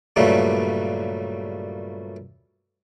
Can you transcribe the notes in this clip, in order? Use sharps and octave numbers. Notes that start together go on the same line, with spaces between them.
G2 A#2 C#3 F#3 G3 A3